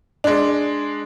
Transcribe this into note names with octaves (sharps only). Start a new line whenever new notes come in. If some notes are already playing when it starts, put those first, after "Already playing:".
G#3 D4